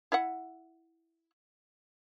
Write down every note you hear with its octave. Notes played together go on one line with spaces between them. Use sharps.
E4 E5 F#5